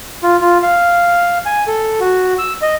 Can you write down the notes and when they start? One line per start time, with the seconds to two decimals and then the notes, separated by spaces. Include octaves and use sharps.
0.23 F4
0.41 F4
0.63 F5
1.46 G#5
1.67 A4
2.00 F#4
2.39 E6
2.62 D#5